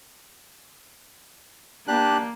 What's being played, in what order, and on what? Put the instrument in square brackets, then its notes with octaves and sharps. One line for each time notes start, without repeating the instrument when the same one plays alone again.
[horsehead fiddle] A#3 [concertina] D4 G4 F#6